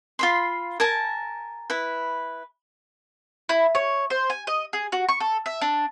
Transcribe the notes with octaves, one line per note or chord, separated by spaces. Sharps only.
F4 B5 C6
A#4 G#5 A5
E4 B4
E4
C#5
C5
G#5
D#5
G#4
F#4
C#6
A4
E5
D4